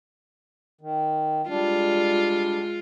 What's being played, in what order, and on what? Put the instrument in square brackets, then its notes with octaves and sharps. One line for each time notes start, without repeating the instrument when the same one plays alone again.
[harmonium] D#3
[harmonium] G3 D4 [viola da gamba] G#3 F4